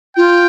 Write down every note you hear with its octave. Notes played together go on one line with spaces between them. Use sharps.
F4 G5